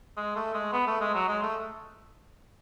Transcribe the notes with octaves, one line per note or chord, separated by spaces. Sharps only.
G#3
A3
G#3
B3
A3
G#3
F#3
G#3
A3